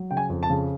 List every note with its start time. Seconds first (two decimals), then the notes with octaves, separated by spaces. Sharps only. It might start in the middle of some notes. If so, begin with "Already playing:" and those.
Already playing: F#3
0.11 C#3 G5
0.17 G#5
0.30 F2
0.43 A5
0.50 C#3